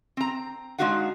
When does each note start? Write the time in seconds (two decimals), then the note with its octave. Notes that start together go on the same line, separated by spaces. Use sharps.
0.17 C4 A#5
0.78 G#3 D4 D#4 F#4 F5 F#5